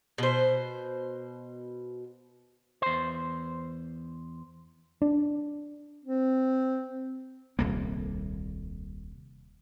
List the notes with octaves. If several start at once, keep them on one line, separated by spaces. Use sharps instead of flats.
B2 C5
E2 C5
D4
C4
D#1 C2 A#3